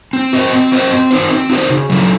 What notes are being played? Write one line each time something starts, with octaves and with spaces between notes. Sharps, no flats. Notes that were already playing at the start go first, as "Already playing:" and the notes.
C4
F#4 C5 D#5
C4
F#4 C5 D#5
C4
D#4 F#4 C5
C4
D#4 F#4 C5
C#3
F#3 C#4 E4 A4